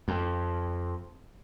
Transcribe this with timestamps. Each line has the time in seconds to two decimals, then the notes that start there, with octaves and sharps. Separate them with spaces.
0.08 F2